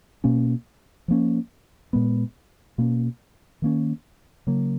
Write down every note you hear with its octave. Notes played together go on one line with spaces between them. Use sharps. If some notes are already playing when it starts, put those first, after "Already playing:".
B2 A#3 C#4
F3 A#3 C#4
A#2 G#3 B3
B2 A#3 C#4
D#3 A#3 C#4
C#3 F#3 A#3